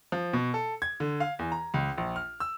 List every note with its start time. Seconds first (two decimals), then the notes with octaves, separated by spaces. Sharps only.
0.12 F3
0.33 B2
0.54 A4
0.82 G#6
1.00 D3
1.20 F5
1.39 E2
1.52 A#5
1.74 C#2
1.98 A#1
2.16 F6
2.40 E6